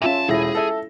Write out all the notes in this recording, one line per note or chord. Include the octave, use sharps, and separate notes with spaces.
A#2 C#4 F4 E5 A5
E1 E4 G#4 A4 A#6
A4 E5